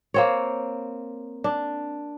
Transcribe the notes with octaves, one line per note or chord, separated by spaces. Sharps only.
A#3 C4 C#5
D4